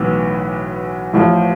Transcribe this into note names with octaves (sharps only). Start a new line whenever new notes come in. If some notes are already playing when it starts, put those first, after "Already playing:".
Already playing: B1 A2 E3 B3
A1 A2 F3